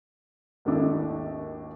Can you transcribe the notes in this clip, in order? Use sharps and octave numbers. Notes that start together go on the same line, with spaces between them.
G#1 D#2 A3 D4 E4